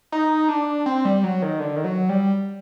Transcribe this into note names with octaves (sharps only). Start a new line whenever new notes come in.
D#4
D4
C4
G3
F#3
D#3
D3
D#3
F#3
G3